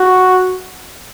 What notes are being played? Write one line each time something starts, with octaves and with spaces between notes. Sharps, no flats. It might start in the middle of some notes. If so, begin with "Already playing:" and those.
Already playing: F#4